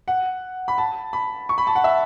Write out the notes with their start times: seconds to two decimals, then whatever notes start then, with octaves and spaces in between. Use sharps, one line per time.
0.08 F#5
0.68 B5
0.78 A5
1.13 B5
1.49 C#6
1.58 B5
1.67 A5
1.75 F#5
1.84 E5